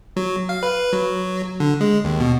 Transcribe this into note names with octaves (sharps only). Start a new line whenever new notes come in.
F#3
F5
B4
F#3
D3
G#3
D#2
B2